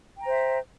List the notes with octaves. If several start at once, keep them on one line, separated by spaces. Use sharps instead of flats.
C5 E5 G5 A#5